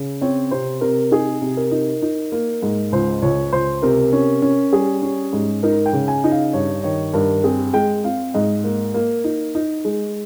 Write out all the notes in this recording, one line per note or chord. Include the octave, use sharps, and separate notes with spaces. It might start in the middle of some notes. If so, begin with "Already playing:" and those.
Already playing: C#3
C4 C#5
C3 C5
C3 A#4
D#4 G#4
C3
A#4
D#4
D#4
A#3
G#2
C#2 C5
C#2 C#5
C#2 C5
C3 A#4
C#4
C#4
G3 G#4
C#4
G#2
D#4 A#4
G5
C#3
G#5
D#4
F5
G2 C#5
D#3 C#5
G2 A#4
C4 G#4
G#3 G5
C4 F5
G#2 D#5
A#3
A#3
D#4
D#4
G#3